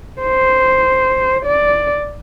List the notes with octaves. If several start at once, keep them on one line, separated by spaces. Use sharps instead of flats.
C5
D5